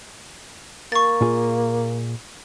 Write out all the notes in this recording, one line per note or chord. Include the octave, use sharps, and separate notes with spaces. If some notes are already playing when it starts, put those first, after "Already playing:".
A#3 C#6 A6
A#2 F4 G#4